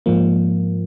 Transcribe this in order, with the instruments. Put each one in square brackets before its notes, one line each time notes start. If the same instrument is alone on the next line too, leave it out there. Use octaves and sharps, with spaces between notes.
[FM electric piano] G#2 F3 A#3